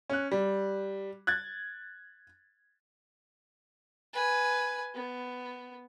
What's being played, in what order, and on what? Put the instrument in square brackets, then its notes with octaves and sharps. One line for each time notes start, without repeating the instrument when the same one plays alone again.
[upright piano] C#4 F#6
G3
F#6 G#6 A6
[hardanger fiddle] B4 G#5
B3